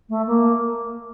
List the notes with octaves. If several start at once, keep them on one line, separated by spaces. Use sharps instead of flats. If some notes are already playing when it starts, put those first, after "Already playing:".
A3
A#3